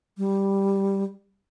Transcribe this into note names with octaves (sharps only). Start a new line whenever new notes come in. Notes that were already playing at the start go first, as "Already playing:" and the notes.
G3